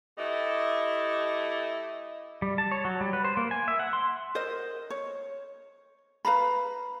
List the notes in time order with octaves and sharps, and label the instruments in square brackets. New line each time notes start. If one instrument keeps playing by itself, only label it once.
[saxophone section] A3 E4 G4 D#5
[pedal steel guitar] G3
A5
C#5
F#3
G3
B4
C5
A#3
G#5
E5
F#5
C6
[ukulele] A#4 C5 D#5
C#5
B4 F5 A#5 B5